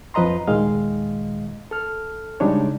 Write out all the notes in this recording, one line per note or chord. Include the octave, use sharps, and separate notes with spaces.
F2 F3 B4 D#5 A#5 C6
D#2 A#2 D#3 G#3 D#5 F5
A4 F6
C#3 G3 G#3 D4 D#4 C#5